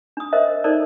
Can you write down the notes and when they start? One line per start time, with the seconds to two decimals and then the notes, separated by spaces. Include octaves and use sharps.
0.17 D4 D#6
0.33 A#4 C5 D#5 E5
0.64 D#4 A4 A#4 C5 D5